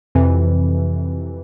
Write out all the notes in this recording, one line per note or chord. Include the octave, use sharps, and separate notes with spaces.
F2 C3 E3